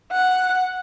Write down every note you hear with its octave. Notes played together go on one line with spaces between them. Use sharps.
F#5